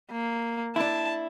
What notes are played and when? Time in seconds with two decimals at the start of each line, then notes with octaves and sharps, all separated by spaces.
0.11 A#3
0.76 D4 E4 A5